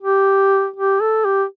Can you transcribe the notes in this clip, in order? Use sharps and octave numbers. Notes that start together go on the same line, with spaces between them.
G4
G4
A4
G4